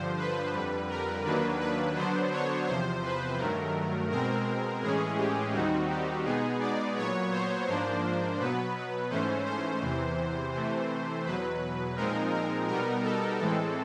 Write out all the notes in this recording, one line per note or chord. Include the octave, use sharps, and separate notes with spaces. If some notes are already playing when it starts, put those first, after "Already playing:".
Already playing: G2 D3 F3 C5
B4
F2 D3 G3 B4
A#4
D#2 D#3 F#3 A#3 D4 B4
B4
D3 F#3 B3 D4 C5
C#5
E2 C3 F3 C5
B4
G2 D#3 F#3 A3 A#4
B2 G#3 C4 A#4
A2 E3 G#3 C#4 G#4
G4
D#2 D#3 G3 C4 D#4 F#4
G4
B2 G#3 B3 D#4 G#4
D5
A#2 F#3 B3 C#5
C5
G#2 F3 A#3 D4 C5
B2 F#3 B3 B4
G#2 E3 A3 C#4 C5
C5
E2 C3 E3
C3 E3 A3
E2 B2 F#3 B4
A#2 F3 G#3 C4 D#4 A#4
A#4
B2 G3 B3 D#4 A#4
A4
A2 E3 G#3 C4 A4